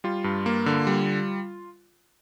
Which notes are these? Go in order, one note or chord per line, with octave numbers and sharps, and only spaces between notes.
G3 F4
G2
A#3
D3
G3